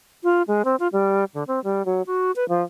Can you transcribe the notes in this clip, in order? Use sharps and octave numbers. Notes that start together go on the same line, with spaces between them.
F4
G#3
C4
F4
G3
D3
C4
G3
F#3
F#4
B4
F3